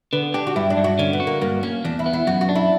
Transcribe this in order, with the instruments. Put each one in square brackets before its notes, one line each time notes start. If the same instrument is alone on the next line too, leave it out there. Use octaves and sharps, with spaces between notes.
[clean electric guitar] D3 [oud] B3
[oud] D4 [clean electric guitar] G4
[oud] F#4
[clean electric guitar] G2 [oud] E4
[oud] D4
[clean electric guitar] G2
[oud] F#4
[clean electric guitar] D3 [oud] C#4
[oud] B3
[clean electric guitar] F#4
[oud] A#3
[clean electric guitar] G2 [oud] A#3
[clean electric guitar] A#3 [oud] C#4
[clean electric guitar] E2 [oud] D4
[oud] E4
[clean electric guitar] B3
[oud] E4
[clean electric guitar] F#2 [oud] F#4
[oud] F#4
[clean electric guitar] D4
[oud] E4